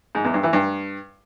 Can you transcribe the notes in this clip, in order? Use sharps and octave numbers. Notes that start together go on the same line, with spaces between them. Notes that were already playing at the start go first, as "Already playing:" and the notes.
G#2
E2
G2
E3
G2